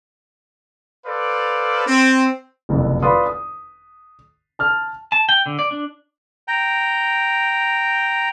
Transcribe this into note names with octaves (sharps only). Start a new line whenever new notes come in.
A4 B4 C5 D5 F5
C4
F#1 C2 F2
F4 B4 D5 B5 C6 D#6
D#6
A5 F6
A5
G5
D3
D5
D4
G5 A#5